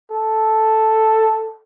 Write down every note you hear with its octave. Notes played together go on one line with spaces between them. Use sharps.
A4